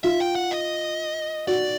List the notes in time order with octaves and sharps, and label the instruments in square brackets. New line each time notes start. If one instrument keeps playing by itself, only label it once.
[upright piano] F4 [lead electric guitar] E5
[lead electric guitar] G5
F#5
D#5
[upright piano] F#4 [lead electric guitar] D5